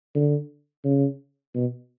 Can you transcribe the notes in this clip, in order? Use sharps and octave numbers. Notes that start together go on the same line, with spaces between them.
D3
C#3
B2